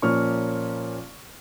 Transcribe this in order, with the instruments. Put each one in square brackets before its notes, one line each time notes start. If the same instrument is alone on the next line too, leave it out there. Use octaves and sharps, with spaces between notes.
[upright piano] A#2 F3 A#3 C#4 C#6 F6